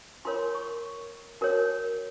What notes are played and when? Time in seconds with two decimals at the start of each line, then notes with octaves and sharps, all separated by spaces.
0.25 F4 A#4 C#5 C6
0.55 C#6
1.41 F#4 A#4 C#5